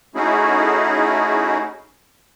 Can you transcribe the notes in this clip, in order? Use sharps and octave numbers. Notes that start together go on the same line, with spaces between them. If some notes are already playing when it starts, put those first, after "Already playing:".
A3 C#4 D#4 E4 F#4 G#4